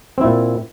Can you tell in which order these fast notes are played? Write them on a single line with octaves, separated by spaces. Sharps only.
C4 E4 A#2